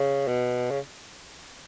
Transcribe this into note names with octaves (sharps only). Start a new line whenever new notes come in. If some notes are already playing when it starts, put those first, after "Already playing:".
Already playing: C#3
B2
C#3